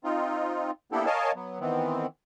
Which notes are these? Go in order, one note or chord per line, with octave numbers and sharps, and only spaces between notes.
C4 D#4 F4
A#3 B3 D4 E4 G4 A4
A#4 C#5 D#5 F5 G#5 A5
F#3 B3
D#3 E3 B3 C4